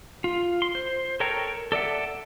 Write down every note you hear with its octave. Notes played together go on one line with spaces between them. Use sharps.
F4
C6
C5
A4 A#4 C#5 G5 A#5
A4 D5 E5 F#5